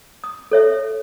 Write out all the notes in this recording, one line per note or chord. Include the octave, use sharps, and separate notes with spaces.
D#6
A4 C#5 E5